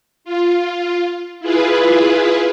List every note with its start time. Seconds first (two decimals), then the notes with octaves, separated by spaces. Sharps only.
0.24 F4
1.40 E4 F4 G#4 B4